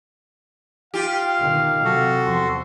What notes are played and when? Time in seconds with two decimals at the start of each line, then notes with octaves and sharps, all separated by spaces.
0.94 F4 G4 F5
1.38 B2 D#3
1.84 C3 F#3 F#4 A4
2.25 E2 F3 C6